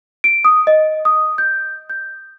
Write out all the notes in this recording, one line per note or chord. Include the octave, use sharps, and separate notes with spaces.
D7
D#6
D#5
D#6
G6
G6